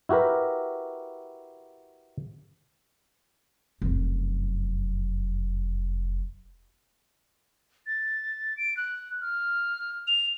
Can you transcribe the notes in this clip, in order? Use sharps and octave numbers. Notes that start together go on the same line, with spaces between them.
E4 F#4 G4 A#4 B4
F1 F#2
A6
D7
F#6
F6
F7